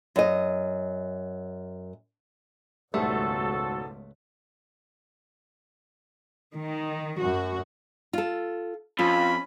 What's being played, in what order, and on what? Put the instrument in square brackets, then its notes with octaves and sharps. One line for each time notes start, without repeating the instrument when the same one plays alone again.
[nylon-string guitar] F#2 D#5
[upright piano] E1 G#2 G3 [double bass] C#2 [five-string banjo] A3 [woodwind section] F#4 A4
[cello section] D#3
[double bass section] F#2 [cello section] F#4
[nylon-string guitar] F4 A4
[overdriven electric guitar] F2 [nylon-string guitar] C#4 [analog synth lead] F4 [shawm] B5